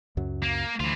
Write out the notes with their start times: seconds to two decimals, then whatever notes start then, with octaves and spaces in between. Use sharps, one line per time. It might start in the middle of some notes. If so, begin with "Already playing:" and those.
0.17 C#2 F#2 F#3
0.43 A#3
0.80 D2 E3 F4